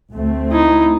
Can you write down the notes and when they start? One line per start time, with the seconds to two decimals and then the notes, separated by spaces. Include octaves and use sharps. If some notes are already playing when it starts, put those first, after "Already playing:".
0.12 D2 A3 C4
0.52 D#4 E4